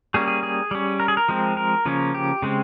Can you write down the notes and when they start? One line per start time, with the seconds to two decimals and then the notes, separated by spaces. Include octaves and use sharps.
0.14 G3 A#3 C#4 G#4
0.28 G#4
0.43 G#4
0.71 G3 C#4
1.00 A#4
1.08 G#4
1.17 A#4
1.28 F3 G#3 C4
1.57 A#4
1.85 C#3 F3 A#3 C#4
2.14 G4
2.42 C#3 G#3 C4